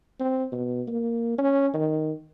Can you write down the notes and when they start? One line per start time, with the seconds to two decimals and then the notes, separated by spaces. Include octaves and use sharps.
0.19 C4
0.52 B2
0.87 A#3
1.38 C#4
1.74 D#3